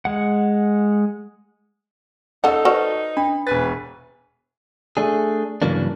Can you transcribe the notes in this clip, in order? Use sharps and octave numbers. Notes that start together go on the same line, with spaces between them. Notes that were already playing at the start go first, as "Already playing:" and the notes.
G#3 F#5
C#4 D#4 F4 A4 F#5 E6
F#4 B4 C5 D5
D4 B5
E1 B4 G#5 A6
A3 D4 G#4
G2 C#3 E3 F#3 A#3 D4